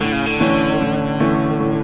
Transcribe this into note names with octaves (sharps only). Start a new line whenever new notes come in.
A2 D3
C#3
D3
E3 A3 C#4
A2
E3 A3 C#4
A2